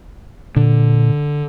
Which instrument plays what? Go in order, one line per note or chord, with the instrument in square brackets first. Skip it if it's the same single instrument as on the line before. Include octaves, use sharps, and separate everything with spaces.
[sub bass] A#2 [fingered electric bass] D3